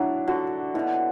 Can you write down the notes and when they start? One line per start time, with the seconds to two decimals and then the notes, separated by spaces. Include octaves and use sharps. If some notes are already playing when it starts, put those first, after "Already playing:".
Already playing: F#3 D4 E4
0.28 D3 F#4
0.74 B2 E4